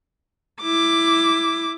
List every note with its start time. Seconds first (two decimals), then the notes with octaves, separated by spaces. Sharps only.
0.61 E4 D6